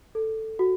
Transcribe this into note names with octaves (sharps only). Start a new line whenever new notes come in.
A4
F#4